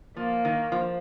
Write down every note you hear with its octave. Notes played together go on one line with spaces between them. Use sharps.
F3 A#3
D#3
F3